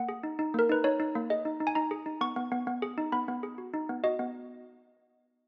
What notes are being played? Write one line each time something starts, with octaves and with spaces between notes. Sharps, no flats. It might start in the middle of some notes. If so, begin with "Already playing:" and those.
Already playing: A#3 F#5
G#4
D#4
D#4
A#3 A#4
D#4 B4
D#4 C#5
D#4
A#3
G#4 D#5
D#4
D#4
G#5
D#4 A#5
G#4
D#4
B3 C#6
B3
B3
B3
G#4
D#4
B3 B5
B3
G#4
F#4
D#4
B3
F#4 D#5
B3